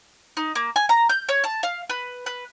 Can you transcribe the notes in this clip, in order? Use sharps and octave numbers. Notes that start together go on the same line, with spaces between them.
D#4
A#3
G#5
A#5
G6
C#5
A5
F5
B4
B4